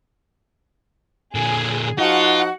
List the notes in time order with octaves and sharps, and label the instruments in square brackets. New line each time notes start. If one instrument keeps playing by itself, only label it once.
[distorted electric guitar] A#2 D3 [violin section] G#4
[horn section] F3 D#4 F#4 [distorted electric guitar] F4 [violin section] F#5